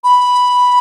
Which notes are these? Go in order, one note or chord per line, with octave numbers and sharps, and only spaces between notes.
B5